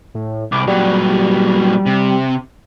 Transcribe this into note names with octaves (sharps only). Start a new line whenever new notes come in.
A2
C2 D6
A#2 F#3 G3
C3